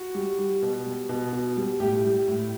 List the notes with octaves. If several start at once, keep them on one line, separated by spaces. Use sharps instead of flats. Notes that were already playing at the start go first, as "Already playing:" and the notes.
Already playing: F#4
G3
G3
B2
G3
B2
B2
G3
A2 G4
G3
A2